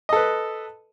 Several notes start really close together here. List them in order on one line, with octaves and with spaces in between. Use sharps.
D#5 A4 B4